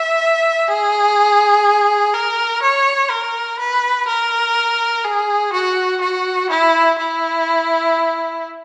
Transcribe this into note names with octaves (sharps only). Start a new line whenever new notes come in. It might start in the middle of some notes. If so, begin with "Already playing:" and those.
Already playing: E5
G#4
A#4
C#5
A#4
B4
A#4
G#4
F#4
F#4
E4
E4